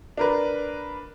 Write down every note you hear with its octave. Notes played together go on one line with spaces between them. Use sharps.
D4 A#4 B4